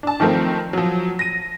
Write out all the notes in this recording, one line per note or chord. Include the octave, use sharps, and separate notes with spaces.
D4 A5
D#3 F3 A3 C4 A#4
F3 F#3
A#6 D#7